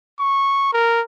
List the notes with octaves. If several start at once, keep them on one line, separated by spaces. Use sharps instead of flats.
C#6
A#4